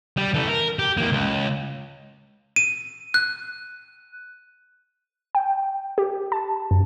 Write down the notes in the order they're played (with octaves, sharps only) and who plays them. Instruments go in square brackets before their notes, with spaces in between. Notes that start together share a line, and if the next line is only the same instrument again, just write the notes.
[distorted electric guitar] G3
E3 A4
A#4
G4
E3 A#3
C#2
[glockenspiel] D#7
F#6
[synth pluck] G5
G4
A5
F#2